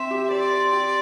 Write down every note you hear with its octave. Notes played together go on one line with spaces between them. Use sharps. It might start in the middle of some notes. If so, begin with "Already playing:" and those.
Already playing: C4 E5
G4
C5 D5
C5
G4